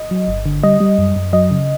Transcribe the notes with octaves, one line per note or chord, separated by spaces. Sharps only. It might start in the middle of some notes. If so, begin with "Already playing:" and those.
Already playing: D#5
F#3
G1
D3
G3 D#5
G3
F#2
F#2
F#3 D#5
C#3